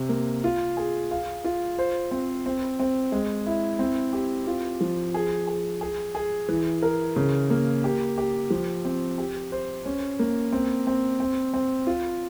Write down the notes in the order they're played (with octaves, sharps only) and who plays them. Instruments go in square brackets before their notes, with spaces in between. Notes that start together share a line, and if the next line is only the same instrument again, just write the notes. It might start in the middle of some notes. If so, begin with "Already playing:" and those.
Already playing: [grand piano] C3
A#3
F4
G#4
F5
F4
C5
C4
C4
C4
G#3
E4
C4
G4
F4
F3
G#4
G#4
G#4
G#4
E3
A#4
C#3
A#3
G4
G4
F3
C4
G4
C5
C#4
A#3
C4
C4
C4
C4
F4